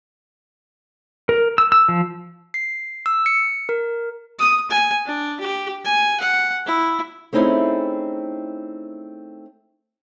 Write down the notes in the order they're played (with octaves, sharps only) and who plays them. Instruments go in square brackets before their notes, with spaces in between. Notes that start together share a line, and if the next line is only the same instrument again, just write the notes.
[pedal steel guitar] A#4
E6
E6
F3
[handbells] C7
E6
C#7
A#4
[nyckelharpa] D#6
G#5
D4
G4
G#5
F#5
E4
[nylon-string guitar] A3 C4 C#4 D#4 E4 G#4